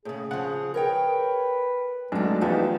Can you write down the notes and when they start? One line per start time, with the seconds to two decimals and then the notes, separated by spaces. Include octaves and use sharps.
0.05 A2 C#3 G#4
0.31 C#3 F3 F#5
0.74 A#4 B4 C#5 G5
2.12 G#1 F#2 G#3 A3 D4 A4
2.41 E2 F3 A3 B3 D#4 F#4 G4